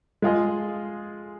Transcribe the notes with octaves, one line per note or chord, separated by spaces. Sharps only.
G#3 F4 G#4 D#5